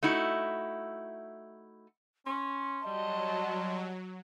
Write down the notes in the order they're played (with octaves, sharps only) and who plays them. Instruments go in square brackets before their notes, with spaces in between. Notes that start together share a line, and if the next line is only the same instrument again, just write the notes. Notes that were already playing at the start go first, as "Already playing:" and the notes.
[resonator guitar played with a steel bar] A3 D#4 E4 F#4
[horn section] C#4 [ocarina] C6
[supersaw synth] F#3 [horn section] G3 [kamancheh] D#5 A5